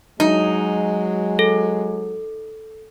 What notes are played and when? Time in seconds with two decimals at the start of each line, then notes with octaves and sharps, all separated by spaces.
0.20 F#3 G#3 D#4
1.39 A4